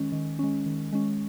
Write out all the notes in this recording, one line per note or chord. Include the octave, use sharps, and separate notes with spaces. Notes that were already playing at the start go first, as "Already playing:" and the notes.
Already playing: D#3 G#3 C#4
D#3
G#3 C#4
D#3
G#3 C#4